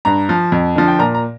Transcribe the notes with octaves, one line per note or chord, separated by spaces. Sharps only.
G2 A#5
F3
F2
D3 F3
G5
A#2 A#5
A#5